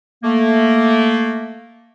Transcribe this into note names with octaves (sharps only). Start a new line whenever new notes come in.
A3 A#3